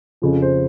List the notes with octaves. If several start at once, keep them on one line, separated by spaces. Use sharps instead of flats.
F2 C#3 F3
C5